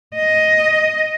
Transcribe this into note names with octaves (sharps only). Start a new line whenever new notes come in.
D#5